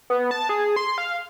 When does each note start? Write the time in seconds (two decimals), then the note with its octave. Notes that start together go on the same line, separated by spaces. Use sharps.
0.10 B3
0.31 A5
0.49 G#4
0.76 C6
0.98 F5